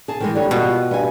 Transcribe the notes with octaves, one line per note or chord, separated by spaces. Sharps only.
G#4 A5
D#3 E3 G#3
D3 G3 C#5
B2 F4
G2 B3 G#5